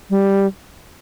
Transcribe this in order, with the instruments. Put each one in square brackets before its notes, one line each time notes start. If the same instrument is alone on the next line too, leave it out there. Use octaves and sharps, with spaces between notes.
[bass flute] G3